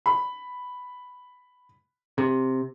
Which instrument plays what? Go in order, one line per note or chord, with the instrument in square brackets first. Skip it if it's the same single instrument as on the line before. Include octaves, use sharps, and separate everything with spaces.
[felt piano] B5
[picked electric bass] C3